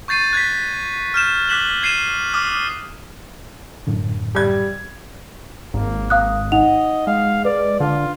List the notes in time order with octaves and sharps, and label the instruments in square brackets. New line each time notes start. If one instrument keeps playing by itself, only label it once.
[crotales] C#6 G6 A6 C7 D#7
F#6 G#6 A6 B6
F6 G6 E7
D6 F#6 B6 E7 F#7
G#6 C7 D#7 E7
D6 D#6 F6
[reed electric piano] F#2 A2 D3
[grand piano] G3 G#6
[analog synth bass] G#1 [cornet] A#3
[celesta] F5 D#6 F#6
[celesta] D#4 F#5 F7 [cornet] D#5
[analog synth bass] G#3 [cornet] F5
[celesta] B4 [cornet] D5
[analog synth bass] D3 [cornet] F4